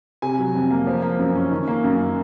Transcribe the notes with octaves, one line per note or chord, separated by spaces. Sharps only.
C3 G#5
F#3
F2
A#3
F3
A#3
F#2
C#4
D#3
A#3
F#2